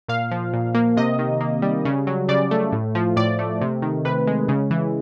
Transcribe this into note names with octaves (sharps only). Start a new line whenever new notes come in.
A#2 F5
F3
A#2
A#3
C3 D#5
D#3
A#3
G3
C#3
F#3
C#3 D5
A3
A2
F3
A2 D5
A3
C3
D#3
C3 B4
G#3
C#3
E3